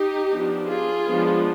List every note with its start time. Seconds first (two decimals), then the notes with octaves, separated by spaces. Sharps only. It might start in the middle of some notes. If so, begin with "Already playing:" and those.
Already playing: D#4 G4
0.31 F3 B3 D4
0.68 F4 G#4
1.06 F3 G#3 B3 D4